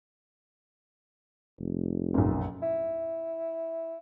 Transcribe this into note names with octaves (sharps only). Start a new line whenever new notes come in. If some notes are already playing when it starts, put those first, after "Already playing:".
F1
F#1 B1
E4